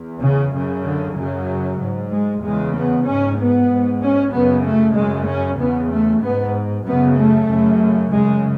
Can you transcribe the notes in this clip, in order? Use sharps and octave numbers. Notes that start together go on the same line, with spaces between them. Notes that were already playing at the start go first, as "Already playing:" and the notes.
Already playing: E2
C#3
F#2 C#3
D3
F#2 C#3 F#3
G#2
G#3
E2 C#3 G#3
B3
G#2 C#4
B3
G#2
C#4
F#2 C#3 B3
A3
F#2 C#3 G#3
C#4
E2 C#3 B3
A3
G#2 B3
F#2 C#3 B3
A3
F#2 C#3
F#2 C#3 G#3